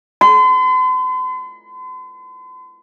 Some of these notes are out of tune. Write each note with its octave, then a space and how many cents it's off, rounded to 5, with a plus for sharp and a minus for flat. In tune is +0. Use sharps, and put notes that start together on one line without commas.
C6 -45